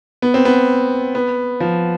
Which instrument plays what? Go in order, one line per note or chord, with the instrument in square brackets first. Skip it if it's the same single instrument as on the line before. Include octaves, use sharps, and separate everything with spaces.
[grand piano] B3
C4
B3
B3
F3